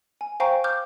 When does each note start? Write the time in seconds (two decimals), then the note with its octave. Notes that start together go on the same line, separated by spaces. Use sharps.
0.21 G#5
0.40 C5 F5 G5 G#5 A#5 C#6
0.64 D6 F6 G6